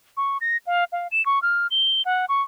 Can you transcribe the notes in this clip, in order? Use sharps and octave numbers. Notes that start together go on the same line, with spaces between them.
C#6
A#6
F5
F5
E7
C#6
F6
G7
F#5
C#6